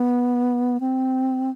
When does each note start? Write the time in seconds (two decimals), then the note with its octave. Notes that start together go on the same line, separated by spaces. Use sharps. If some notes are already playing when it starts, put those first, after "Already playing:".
Already playing: B3
0.80 C4